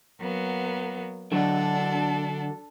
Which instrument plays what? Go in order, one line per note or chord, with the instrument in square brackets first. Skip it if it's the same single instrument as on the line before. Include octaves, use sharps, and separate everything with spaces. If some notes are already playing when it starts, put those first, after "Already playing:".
[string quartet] F#3 A#3 B3
[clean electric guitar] D3 F#3 F#4 [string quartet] D4 A4